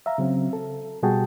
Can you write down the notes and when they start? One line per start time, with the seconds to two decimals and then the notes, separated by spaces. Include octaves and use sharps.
0.06 E5 F5 A#5
0.18 C#3 F#3 C4
0.53 A4
1.03 B2 G3 F#4 G#4 G5 A5